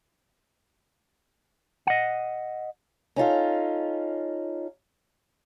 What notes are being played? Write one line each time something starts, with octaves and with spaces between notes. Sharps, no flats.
D#5 F#5
C#4 D#4 F4 A4